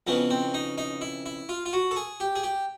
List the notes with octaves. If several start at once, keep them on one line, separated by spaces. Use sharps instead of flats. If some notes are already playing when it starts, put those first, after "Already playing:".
F2 C#3 E3 B3
C4
D#4
D#4
E4
E4
F4
F4
F#4
A4
G#4
G4
G#4
G4